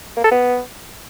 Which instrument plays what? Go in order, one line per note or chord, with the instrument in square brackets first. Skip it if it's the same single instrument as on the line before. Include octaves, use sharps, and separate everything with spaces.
[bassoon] A#3
A4
B3